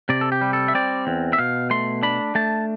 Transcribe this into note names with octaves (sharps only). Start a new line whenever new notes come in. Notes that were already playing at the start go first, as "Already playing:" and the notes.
C3 D5
A4
G4
G3
A4
E5
C4 D5
E2
E5
B2 F5
A3 C6
D4 B5
A3 A5